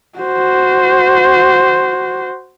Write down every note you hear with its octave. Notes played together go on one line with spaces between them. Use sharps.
F#4 C5